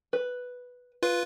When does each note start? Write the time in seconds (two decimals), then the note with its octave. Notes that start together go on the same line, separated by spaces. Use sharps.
0.13 B4
1.03 F4 B4 F5